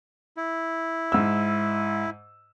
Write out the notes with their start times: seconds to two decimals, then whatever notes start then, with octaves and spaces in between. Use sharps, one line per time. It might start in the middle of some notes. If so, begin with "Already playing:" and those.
0.37 E4
1.12 G#2 E6